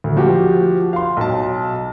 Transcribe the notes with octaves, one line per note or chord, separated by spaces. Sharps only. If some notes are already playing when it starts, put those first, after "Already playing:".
D2
F3 F#4 G4
F5 C6
B1 A5